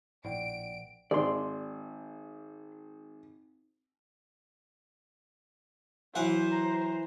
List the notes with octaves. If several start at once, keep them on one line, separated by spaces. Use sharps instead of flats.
A#1 A2 D5 F#5 G5 D7
G#1 D5 C6
E3 F#3 C5 F#5
A#5